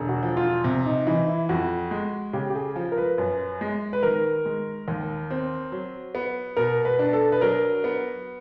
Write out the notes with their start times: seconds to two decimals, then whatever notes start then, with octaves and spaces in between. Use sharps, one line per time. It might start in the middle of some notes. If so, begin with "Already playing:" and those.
Already playing: E1 D3
0.09 F#4
0.23 F3
0.37 F4
0.64 C3
0.86 D#4
1.07 E3 D#4
1.28 E4
1.49 F2 F#4
1.91 G#3
2.33 C#3 G4
2.50 G4
2.56 G#4
2.76 F3
2.92 A#4
2.98 B4
3.18 F#2
3.61 G#3
3.93 B4
4.03 D#3 A#4
4.45 G#3
4.88 D#2
5.30 C4
5.72 F#3
6.15 B3
6.57 B2 A#4
6.85 B4
6.99 D4
7.13 A4
7.32 B4
7.41 F#3 A#4
7.84 B3